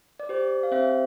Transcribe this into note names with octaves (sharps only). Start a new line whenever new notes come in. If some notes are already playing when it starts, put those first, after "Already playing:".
D5
G4 C5
F5
C4 C5 E5